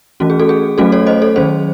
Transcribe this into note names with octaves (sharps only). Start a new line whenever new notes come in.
E3 A3 C#4 F#4
G#4
F#4 A4
G#4
F#3 A3 C#4 F#4 A4
A4 C#5
C5 D#5
A4 C#5
D#3 F#3 C#4 G#4 C5